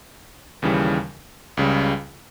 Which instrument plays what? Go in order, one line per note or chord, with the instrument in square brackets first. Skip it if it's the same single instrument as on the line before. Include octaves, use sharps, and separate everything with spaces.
[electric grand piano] D#2 C#3 E3 G3
C#2 C#3 G3